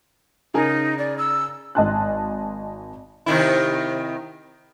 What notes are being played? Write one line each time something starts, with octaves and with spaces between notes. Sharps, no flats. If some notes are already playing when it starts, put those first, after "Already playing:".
C#3 D#4 G#4 A#4
D5
E6
G#1 D#5 G#5 A5 C6 F#6
C3 D#3 E4